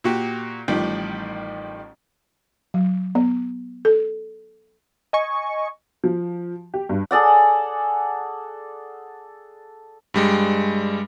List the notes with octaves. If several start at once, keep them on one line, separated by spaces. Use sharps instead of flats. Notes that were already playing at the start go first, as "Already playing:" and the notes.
A#2 F#4 G4
A1 A2 D#3 F3 G3
F#3
B3
A4
D#5 G#5 C#6
F3
G4
G2
G#4 A4 D5 F#5
G2 G3 G#3